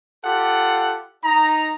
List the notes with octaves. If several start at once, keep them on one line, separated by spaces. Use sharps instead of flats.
F4 G4 A4 F#5
D#4 A#5